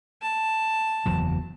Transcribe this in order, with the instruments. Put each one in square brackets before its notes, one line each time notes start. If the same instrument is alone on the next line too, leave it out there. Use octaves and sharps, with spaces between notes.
[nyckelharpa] A5
[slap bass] F#1 E2 F#3